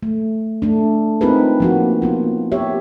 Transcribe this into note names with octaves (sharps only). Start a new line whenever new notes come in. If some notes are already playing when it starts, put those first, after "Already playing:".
A3
A3 D4
C4 D#4 F4 G#4 A#4 B4
F3 A#3 F#4
A#3 B3 F4
G4 C#5 E5